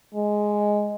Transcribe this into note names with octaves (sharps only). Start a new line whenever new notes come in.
G#3